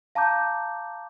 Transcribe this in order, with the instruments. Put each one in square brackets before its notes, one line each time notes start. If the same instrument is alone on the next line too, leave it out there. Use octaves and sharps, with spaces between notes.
[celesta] F5 A5 A#5 D6 G6